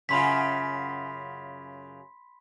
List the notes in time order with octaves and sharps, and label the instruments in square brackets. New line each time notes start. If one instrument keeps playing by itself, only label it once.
[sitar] F#2 C#3 F4 [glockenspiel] B5 C6 B6